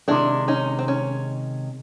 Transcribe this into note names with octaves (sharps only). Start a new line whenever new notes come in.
C3 D#3 G#3 D4 E4
C#4 D#4
C4
C#4